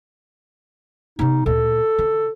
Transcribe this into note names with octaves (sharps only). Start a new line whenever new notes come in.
C3 B3 D#4
D2 A#2 A4
D3